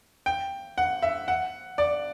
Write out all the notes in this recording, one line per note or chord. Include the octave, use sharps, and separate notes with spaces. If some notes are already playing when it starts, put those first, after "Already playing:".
G5
F#5
E5
F#5
D5